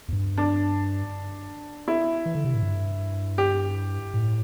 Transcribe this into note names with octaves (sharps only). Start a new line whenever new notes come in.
E2
G2
D4
E4
E3
D3
C3
A2
G2
G4
A2